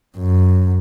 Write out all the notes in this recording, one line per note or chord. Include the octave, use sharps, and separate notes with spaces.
F#2